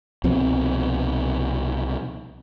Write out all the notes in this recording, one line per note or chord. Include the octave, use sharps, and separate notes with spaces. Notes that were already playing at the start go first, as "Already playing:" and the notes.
C2 B2 F3 C4